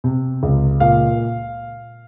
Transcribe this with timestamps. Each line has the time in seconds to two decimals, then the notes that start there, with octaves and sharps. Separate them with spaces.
0.04 C3
0.43 C#2
0.80 A#2 F5